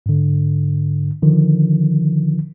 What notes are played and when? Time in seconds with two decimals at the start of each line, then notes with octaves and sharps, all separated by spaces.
0.06 G#2 D3
1.23 D3 D#3 F3